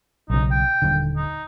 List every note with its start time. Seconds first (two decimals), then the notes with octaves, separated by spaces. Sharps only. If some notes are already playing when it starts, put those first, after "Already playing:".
0.30 B1 C#3 D#4
0.51 G5
0.82 D#1 D3
1.16 D#4